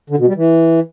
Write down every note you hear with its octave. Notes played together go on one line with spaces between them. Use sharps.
D3
B2
G3
E3